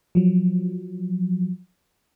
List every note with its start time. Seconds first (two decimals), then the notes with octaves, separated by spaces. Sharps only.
0.15 F3 F#3